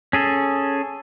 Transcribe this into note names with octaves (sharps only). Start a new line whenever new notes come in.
C#4 G#4 A4